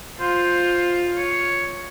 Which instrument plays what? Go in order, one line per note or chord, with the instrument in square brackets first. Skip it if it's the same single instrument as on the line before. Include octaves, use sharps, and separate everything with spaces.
[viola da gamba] F4 [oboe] C5
[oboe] C#5